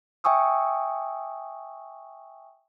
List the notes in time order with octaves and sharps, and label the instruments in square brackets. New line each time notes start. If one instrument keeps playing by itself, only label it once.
[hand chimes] E5 G5 G#5 C#6 D#6 E6